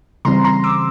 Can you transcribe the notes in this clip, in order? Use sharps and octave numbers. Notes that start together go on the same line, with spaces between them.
C#3 E3 G3 C4 A#5 C6
A#5 C6
D6 E6